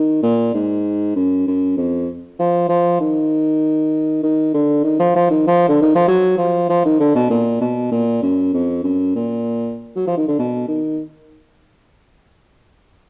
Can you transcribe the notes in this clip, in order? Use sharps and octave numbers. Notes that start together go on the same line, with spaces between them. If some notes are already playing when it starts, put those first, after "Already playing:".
Already playing: D#3
A#2
G#2
F#2
F#2
F2
F3
F3
D#3
D#3
D3
D#3
F3
F3
D#3
F3
D3
D#3
F3
F#3
F3
F3
D#3
D3
B2
A#2
B2
A#2
F#2
F2
F#2
A#2
F#3
F3
D#3
D3
B2
D#3